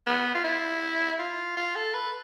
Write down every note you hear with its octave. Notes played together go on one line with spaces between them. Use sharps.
B3
F4
E4
F4
F4
A4
B4